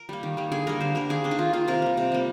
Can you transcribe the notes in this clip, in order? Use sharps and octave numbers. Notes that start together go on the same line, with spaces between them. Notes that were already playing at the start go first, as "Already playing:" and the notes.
Already playing: A#4
G3 A#3
D#3
G3 A#3
D3 G#4
G3 A#3 A#4
D3 C5
G3 A#3 A#4
D#3 G#4
A#3 D4
D#4
D#3 F4
A#3 F4
C3 A#4
G3 A#3
C3
G3 A#3